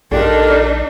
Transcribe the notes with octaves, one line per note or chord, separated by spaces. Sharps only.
A#1 D4 D#4 F4 G4 A4 A#4